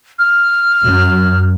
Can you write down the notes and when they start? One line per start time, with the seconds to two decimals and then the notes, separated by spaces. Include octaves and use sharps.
0.19 F6
0.83 F#2